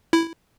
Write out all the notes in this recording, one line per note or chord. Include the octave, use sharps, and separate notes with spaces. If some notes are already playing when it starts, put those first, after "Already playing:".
E4